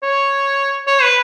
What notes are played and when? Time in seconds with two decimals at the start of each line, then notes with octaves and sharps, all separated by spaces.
0.03 C#5
0.87 C#5
1.02 B4